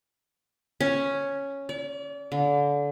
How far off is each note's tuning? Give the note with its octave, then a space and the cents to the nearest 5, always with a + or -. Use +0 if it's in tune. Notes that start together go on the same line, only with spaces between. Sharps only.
C#4 +0
D5 -40
D3 -30